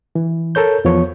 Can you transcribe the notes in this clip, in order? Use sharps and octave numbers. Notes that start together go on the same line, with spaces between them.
E3
A4 A#4 C#5 G6
E2 F3 B3 C#5 C#6